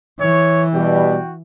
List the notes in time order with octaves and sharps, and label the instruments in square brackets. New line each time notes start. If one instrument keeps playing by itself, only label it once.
[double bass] E3 [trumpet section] C#5
[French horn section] B2 G3 [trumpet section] F#4 G5